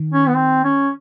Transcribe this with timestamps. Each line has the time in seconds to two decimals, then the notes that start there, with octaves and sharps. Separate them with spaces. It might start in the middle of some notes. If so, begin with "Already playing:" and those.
Already playing: D#3
0.13 C#4
0.28 B3
0.36 C4
0.64 C#4